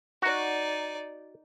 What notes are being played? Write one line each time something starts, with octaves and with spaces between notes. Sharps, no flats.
D#4 F#4 D5